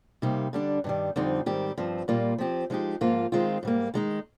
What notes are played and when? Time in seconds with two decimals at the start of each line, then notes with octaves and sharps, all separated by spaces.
0.22 C3 G3 A#3 D#4
0.53 D3 G3 D4
0.84 G2 D#3 G3
1.16 F2 D3 G3 C4 D#4
1.46 G#2 D#3 G3 C4 G4
1.77 G2 F3 C4
2.08 A#2 G3 A#3 F4
2.38 F3 C4 G4
2.70 F3 G#3 D#4 G4
3.01 G#2 F3 A#3 F4
3.32 D#3 G#3 C4 F4
3.63 G#2 G3 A#3
3.94 D#3 G#3 D#4